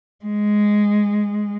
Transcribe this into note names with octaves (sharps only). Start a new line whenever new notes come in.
G#3